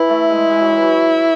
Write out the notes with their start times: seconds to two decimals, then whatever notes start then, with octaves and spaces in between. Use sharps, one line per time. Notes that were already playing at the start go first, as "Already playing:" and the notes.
Already playing: E3 E4
0.09 A3
0.30 G#3
0.51 G#3
0.61 F#3
0.72 E3
0.82 F#3